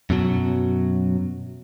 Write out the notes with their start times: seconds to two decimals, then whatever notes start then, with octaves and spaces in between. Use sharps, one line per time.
0.10 F#2 B2 F#3